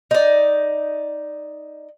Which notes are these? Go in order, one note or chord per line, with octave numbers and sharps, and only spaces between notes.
D#4 D5